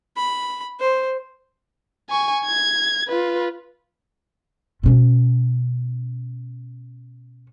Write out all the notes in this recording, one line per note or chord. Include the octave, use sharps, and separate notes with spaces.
B5
C5
G#5 C#6
G#6
F4 B4
B2 C#4